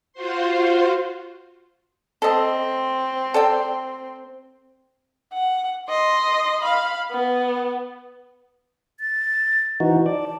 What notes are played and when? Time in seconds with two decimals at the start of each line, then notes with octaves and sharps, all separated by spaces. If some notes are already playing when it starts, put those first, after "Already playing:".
0.13 F4 F#4 C5 C6
2.22 C4 A4 D#5
3.34 A4 D5 G5
5.33 F#5
5.89 D#5 C6
6.62 F5 B5
7.11 B3
9.00 A6
9.80 E3 D#4 F#4 C5
10.06 D5 A5